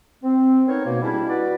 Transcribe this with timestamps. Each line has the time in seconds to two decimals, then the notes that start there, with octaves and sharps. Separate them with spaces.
0.23 C4
0.67 B3 C#4 D#4 A#4 C5 C#5
0.85 B2 A#3
1.02 G3 G#3 C#4 D4 E4
1.28 F#4 B4 D5